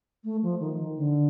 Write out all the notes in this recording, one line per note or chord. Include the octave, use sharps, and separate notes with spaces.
A3
F3
D#3
D3